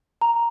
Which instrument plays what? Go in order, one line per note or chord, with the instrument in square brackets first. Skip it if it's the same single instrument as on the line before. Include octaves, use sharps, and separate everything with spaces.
[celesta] A#5